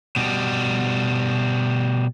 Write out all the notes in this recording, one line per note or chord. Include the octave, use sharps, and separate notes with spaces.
B2 G3